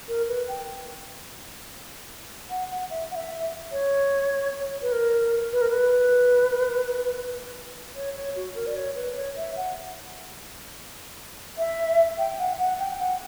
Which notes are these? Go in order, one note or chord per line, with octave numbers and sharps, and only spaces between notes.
A#4
B4
G5
F#5
F#5
E5
F#5
E5
C#5
B4
A#4
B4
A#4
B4
C#5
C#5
F#4
A#4
D5
C#5
B4
C#5
E5
F#5
E5
G5
F#5
F#5
G5
F#5